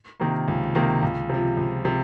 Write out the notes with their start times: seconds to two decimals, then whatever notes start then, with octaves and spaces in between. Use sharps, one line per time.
0.20 C3 D#3 A#3
0.48 C#2
0.75 C3 D#3 A#3
1.02 C#2
1.29 C3 F3
1.57 C#2
1.85 C3 F3